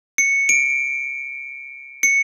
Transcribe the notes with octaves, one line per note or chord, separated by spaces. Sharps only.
C#7
D7
C#7